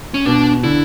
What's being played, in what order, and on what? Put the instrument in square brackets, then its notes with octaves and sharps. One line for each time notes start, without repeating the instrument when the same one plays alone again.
[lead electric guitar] C#4
[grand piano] B2 [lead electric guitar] D4
[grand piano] D3 [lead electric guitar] E4